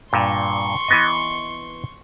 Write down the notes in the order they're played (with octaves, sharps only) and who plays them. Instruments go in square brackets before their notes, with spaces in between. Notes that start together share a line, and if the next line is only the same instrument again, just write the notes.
[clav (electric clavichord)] G2 A#2 [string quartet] C6 C#6
[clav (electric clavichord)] E3 B3 D#5